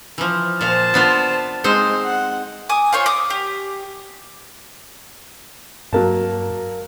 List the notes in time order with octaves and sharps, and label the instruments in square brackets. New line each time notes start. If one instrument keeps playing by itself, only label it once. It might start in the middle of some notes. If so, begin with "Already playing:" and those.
[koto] E3 F3
[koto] A#2 F5 [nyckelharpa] C5 A5
[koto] B3 D4 F4
[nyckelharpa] G#3 [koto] C4 D#4 C5
[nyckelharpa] F#5
[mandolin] G#5 D6 D#6
F4 C5 C#5
D6 D#6
G4
[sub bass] G2 [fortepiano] F#3 A#3 A5